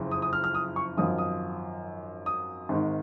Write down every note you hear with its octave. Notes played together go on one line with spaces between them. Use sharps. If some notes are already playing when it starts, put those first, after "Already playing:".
Already playing: F#1 F2 C#3
D#6
D#6
F6
F6
D#6
C#6
G#1 F#2 F3 D#6
D#6
D#6
G#1 G#2 D#3